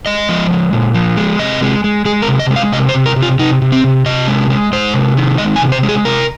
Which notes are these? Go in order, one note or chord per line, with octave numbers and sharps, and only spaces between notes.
G#3 D#5
F3
G#3
A#2
F3
G#3
C3 D#5
G#3
G#3
G#3 G#4
A#4
C3
D#5
G#3
F5
C3 D#5
C5
C3
A#4
C3
F4
C3 D#4
C3
C4
C3
C3 D#5
G#3
G#3
G#3 C5
C3
D#3
G#3 D#5
G#5
C3
C5
G#3
G#4
C3 A#4